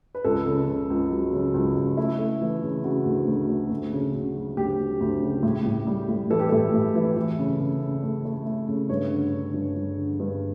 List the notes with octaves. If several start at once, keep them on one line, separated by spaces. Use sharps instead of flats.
B4
C#2 A4
C#3
C#3
C#2
F#3
C#3
C#2
C#2
A3 E4
A3
E3
C#3
C#3 F#4
D2
D2
A3
D2
C#3
C#3
F#3
D2 G4
F#3
D2
C#3
A2
A2
G3
A2
E3 A4
G4
A2 A4
A2
E3
E3
C#3
C#3
C#3
A3
A3
A3
C#3
G2 C#5
D3
D3
G2
G2
D3
G2